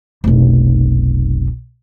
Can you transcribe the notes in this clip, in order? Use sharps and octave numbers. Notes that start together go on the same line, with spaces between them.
F1 B1